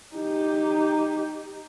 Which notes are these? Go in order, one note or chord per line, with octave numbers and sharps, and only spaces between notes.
D#4 G4